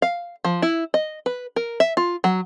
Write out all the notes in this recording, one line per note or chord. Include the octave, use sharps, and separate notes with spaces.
F5
F3
E4
D#5
B4
A#4
E5
F4
F#3